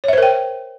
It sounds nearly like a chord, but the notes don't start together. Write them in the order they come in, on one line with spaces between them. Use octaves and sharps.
C#5 E5 C5 A#4 G5